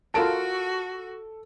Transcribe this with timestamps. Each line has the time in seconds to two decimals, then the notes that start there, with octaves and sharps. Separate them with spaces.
0.14 F4 F#4 A4 A#4 A5 D7